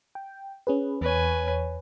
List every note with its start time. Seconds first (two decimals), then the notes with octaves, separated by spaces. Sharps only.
0.15 G5
0.67 C#4 G#4 B4
1.01 E2 B4 C#5 G#5